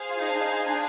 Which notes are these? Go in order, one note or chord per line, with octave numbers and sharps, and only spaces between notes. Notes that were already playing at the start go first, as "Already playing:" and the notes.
Already playing: G#4 C5 F5 G#5
F4
D#4
D4
D#4
D4